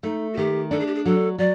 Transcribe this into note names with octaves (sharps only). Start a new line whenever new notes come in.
A3 D#4
F#4
D#3 G4
D4 A4
G#4
G4
G#4
F#3 A4
F#3 D5